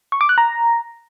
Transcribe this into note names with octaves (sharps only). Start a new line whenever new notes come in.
C#6
D6
F#6
A#5